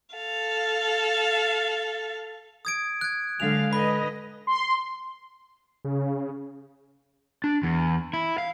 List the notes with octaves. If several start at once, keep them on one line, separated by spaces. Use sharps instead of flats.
A4 F5
D#6 G#6 D7
F#6 G#6
D3 F#3 G#3 A4 F5 F7
D3 B4 D#5 B5
C6
C#3
D4
E2
E4
F5